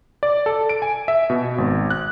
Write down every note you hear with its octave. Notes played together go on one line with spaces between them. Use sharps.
D5
A4
D7
G#5
E5
B2
G#1
F#6